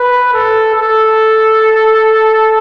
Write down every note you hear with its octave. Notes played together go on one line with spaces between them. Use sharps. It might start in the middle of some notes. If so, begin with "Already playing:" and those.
Already playing: B4
A4
A4